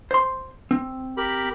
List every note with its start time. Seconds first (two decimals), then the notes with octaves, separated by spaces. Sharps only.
0.11 C5 C6
0.71 C4
1.17 G4 A#4 B5